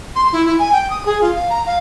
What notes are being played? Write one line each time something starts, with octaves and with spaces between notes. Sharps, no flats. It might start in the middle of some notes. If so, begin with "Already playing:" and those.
C6
E4
E4
G#5
G5
D#6
G#4
F4
F5
A#5
F5